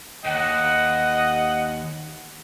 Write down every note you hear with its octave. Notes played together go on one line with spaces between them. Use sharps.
D#2 D#5 F#5